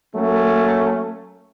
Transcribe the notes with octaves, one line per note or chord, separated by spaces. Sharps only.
F#3 A3 A#3 C#4